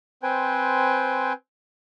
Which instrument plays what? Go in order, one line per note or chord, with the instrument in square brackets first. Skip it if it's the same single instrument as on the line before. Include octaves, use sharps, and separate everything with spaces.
[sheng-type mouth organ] C4 B4 C5 G5 G#5